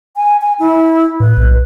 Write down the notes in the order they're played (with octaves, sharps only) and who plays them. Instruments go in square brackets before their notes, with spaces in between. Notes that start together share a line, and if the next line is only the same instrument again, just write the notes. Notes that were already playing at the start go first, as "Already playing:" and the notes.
[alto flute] G#5
G#5
E4
[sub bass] A2 [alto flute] B4
[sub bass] B1